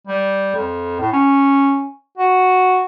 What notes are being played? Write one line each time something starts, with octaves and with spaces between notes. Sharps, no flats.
G3
F2
A2
C#4
F#4